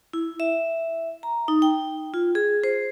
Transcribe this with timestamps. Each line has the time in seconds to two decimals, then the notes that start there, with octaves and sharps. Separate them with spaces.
0.13 E4
0.40 E5
1.23 A#5
1.48 D#4
1.62 G5
2.14 F4
2.35 G#4
2.64 C5